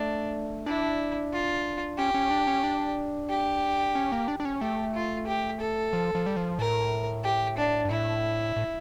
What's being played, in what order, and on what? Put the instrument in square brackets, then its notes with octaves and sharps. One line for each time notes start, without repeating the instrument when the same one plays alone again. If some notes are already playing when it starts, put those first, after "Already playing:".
Already playing: [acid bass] A3 [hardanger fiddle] D4
[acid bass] D4 [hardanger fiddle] E4
[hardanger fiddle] F4
[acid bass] C#4 [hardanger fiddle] G4
[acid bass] C#4
D4
C#4
D4
[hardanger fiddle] G4
[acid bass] C#4
A#3
D4
D4
C#4
[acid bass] A3 [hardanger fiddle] G4
[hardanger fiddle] F4
G4
A4
[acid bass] F3
F3
G3
F3
[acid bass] A2 [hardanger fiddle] A#4
[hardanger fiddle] G4
D4
[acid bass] G2
[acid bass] A2 [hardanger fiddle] E4
[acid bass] A2